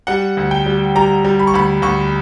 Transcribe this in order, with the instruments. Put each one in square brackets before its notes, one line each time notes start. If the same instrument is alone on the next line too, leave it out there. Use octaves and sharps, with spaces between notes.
[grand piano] G3 F#5
D2
G5
G3
G3 A#5
G3
B5
C#6
D2 B5
D2 C#6